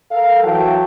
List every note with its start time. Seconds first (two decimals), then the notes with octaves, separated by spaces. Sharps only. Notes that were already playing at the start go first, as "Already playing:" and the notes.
0.12 A4 A#4 F5
0.43 E3 F#3 F#5 G5 A5